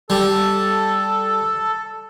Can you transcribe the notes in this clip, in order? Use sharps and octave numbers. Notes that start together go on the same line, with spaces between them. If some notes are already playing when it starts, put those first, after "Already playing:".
G3 A4